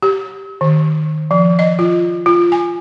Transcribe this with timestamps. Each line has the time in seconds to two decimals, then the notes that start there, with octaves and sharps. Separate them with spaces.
0.02 G4
0.61 D#3
1.31 F3
1.59 D#5
1.79 F4
2.26 F4
2.52 G#5